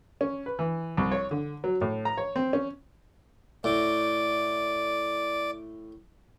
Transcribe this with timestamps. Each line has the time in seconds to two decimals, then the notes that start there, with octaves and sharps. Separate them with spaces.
0.21 C#4
0.46 B4
0.59 E3
0.97 C2
1.11 C#5
1.31 D3
1.64 F#3
1.81 A2
2.05 A#5
2.17 C#5
2.36 C4
2.53 C#4
3.64 A2 D5